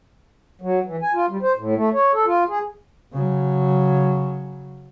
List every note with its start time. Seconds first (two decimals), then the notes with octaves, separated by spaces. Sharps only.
0.61 F#3
0.85 E3
1.02 G#5
1.14 F4
1.29 G3
1.42 C5
1.57 A2
1.76 A3
1.93 C#5
2.13 A4
2.26 F4
2.49 G#4
3.13 C#3 F#3